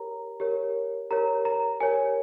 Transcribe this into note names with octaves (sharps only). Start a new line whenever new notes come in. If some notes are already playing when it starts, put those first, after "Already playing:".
Already playing: G4 A#4 C#5 A#5
G4 A#4 C#5
G4 A#4 C#5 A#5
A#5
G4 A#4 C#5 G#5